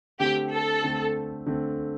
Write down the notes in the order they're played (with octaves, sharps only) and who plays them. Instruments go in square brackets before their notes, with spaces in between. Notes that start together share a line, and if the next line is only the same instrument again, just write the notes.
[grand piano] D3 A3 C4 [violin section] G4
[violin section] A4
[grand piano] D3 A3 C4
D3 A3 C4